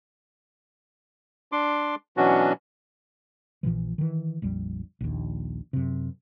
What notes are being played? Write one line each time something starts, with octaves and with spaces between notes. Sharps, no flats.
D4 C6 D6
B2 E3 F#3 C#4 D4 F#4
A#1 A#2 E3 F3
D#3 E3
A#1 F2 G3
A#1 D#2
F#2 C3